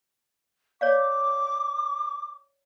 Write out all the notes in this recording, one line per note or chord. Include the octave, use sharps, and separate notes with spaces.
C#5 D5 F5 D6